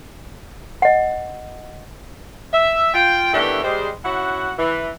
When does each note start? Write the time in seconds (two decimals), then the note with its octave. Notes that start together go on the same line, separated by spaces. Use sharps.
0.82 D#5 F#5
2.53 E5
2.94 F4 G5
3.34 D#3 E3 A3 B3 D4 G4
3.64 G3 G#3 C5
4.04 C#4 E4 F#4 F#5
4.58 E3